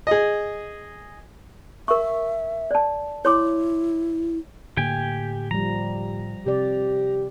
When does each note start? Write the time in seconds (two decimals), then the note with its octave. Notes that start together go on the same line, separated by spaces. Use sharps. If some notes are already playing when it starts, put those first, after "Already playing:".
0.07 G#4 D#5
1.88 A#4 E5 C#6
2.71 D5 A5
3.25 E4 C#5 C6 D6
4.77 A2 D3 A#3 G4 G5 G#5
5.51 F3 G3 A#5
6.46 C3 G4 D5